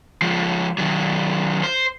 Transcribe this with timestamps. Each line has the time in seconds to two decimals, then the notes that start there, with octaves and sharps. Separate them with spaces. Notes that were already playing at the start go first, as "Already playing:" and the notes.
0.22 F3 G#3
0.78 D#3 F#3
1.63 C5